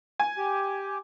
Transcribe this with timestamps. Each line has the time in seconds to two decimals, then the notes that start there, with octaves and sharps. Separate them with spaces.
0.20 G#5
0.38 G4